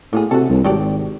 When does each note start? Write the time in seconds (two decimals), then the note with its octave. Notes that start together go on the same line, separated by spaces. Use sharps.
0.13 A2 A#3 B3 G#4
0.31 C3 F#4 A4
0.50 C2
0.64 G#1 F#3 G4 D5